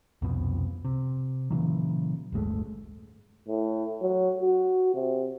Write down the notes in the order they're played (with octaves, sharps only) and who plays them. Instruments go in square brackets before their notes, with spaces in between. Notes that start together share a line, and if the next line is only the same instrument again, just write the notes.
[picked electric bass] C2 F2 B2
C3
A#2 C#3 E3 F#3
D1 G1 G#3 A3
[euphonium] A2
F#3
F#4
C3